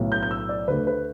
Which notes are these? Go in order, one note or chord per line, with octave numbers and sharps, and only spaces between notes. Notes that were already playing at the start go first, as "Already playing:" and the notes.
Already playing: B1 A2 A3
G6
G6
E6
D5
D2 D3 A3 B4
B4